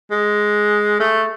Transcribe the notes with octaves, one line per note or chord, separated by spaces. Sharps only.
G#3
A3